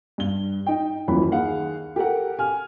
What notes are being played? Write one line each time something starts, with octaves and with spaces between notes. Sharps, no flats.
G2 G7
D#4 G5
D#1 F#2 E3 B5
D#2 D#4 G#4 F5 F#5
G4 A4 A#4 F#5
G#5 F6